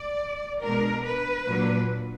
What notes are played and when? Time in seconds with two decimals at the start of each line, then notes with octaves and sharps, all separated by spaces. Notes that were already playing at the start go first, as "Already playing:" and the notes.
Already playing: D5
0.62 B2 G#3 D4 A#4
1.04 B4
1.47 A#2 F#3 A#3 D4